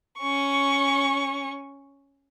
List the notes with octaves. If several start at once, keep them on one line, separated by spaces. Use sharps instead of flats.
C#4 C#6